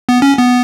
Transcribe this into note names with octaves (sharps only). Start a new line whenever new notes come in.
B3
C#4
B3